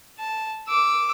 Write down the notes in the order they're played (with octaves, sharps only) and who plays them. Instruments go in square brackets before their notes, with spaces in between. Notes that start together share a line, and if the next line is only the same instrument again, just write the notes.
[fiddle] A5
D6 E6